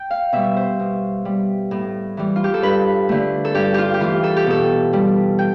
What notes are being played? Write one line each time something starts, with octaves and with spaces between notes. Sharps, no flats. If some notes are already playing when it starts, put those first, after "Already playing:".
Already playing: G5
F5
B2 G3 E5
C5
B2
G3
A2
E3 G3
F4
G4
A4
G2 B4
D3 A3
A4
G2 G4
F4 G4
G4
E3 A3 F4
A4
G4
B2 A4
G3
G5